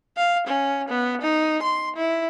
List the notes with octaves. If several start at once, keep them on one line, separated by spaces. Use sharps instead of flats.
F5
C#4
B3
D#4
C6
E4